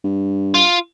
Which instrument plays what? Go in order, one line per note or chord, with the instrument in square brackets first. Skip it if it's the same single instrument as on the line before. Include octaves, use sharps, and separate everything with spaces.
[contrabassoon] G2
[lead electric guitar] F4